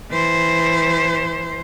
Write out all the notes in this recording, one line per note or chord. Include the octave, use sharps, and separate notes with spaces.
E3 C5